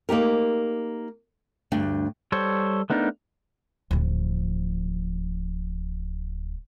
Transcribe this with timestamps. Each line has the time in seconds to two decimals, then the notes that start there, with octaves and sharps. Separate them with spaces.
0.09 A#3 D#4 G4 A#4
1.72 D2 G2 D4 G5
2.32 G3 A4 C5 C#5
2.90 A3 B3 D4 D#4 A#4
3.91 D1 F3